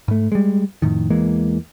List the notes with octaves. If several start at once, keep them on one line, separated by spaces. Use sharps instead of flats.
G#2 A3
G3 G#3
F2 A2 D#3
E2 E3 G#3 A#3